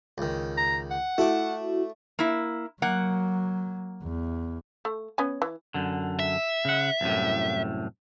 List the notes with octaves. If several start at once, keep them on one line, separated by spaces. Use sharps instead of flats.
C#2 D#3
A#5
F#5
A3 E4 F#4 D6
A#3 E4
F#3 A#3 F#5
E2
A3
B3 C#4 G#5
E3
F#2 D3
E5
C#3 F#5
C2 F#2 A2